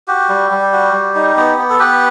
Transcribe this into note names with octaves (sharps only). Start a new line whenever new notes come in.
F#4 G4
G3
G3
F#4
G3
D#4
B3
B3
A4
B3 G4 B4